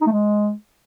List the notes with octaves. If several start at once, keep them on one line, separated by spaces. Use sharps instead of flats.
D#4
A3
G#3